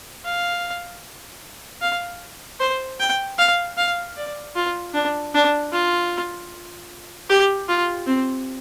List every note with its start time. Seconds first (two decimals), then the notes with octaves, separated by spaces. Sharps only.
0.25 F5
1.82 F5
2.60 C5
3.00 G5
3.38 F5
3.77 F5
4.16 D5
4.55 F4
4.94 D4
5.34 D4
5.72 F4
7.29 G4
7.68 F4
8.07 C4